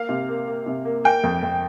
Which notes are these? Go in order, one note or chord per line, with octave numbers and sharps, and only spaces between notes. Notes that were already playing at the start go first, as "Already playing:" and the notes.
Already playing: A#3 F5
C3
A#3
A#3
C3
A#3
A#3 G5
F2
F2